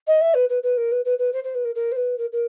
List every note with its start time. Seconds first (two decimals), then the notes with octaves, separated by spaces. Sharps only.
0.07 D#5
0.21 E5
0.34 B4
0.49 B4
0.63 B4
0.77 A#4
0.91 B4
1.05 B4
1.18 B4
1.33 C5
1.43 C5
1.54 B4
1.64 A#4
1.75 A#4
1.91 C5
1.96 B4
2.18 A#4
2.32 A#4